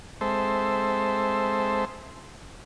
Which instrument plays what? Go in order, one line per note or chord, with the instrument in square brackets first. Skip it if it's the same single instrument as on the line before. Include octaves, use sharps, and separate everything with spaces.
[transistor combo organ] G#3 C4 A4 C5 E5